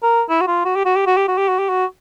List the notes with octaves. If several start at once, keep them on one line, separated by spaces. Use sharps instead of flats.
A#4
E4
F#4
F4
F#4
G4
F#4
G4
F#4
G4
F#4
G4
F#4
G4
F#4